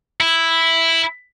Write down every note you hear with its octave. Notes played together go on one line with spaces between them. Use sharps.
E4